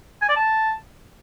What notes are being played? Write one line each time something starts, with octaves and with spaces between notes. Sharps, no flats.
G#5
D5
A5